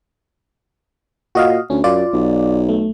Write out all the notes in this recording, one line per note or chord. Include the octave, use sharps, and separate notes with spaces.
A#2 F#4 D#5 F5
D2 C#4
F#2 F4 D5
B1
A3